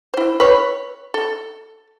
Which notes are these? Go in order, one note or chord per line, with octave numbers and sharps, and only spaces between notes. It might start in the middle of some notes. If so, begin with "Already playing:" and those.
E4 C5
B4 C#5
A4